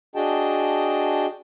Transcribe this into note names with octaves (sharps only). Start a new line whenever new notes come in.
D4 F#4 G#4 D#5 G5 A5